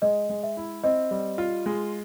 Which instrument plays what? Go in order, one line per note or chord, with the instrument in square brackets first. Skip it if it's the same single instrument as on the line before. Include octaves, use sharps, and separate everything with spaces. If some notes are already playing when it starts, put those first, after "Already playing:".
[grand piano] G#3 [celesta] D#5
[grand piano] G#3
[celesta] E5
[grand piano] E4
[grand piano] C4 [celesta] D#5
[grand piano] G3
F4
G#3